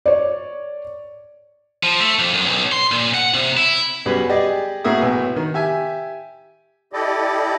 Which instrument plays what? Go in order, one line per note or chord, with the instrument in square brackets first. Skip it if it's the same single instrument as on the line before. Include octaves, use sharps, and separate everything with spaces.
[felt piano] C#5 D5
[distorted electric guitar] F3
A3
F2
F#2
B1
C6
A#2
F#5
C3
E4
[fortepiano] B1 F#2 G3 G#4 B4 B5
G4 G#4 D5 D#5
A2 A#3 F#4 G#4 E5 D#6
B1 A2 B4
D#3
G4 E5 G#5
[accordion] E4 G4 A4 D5 D#5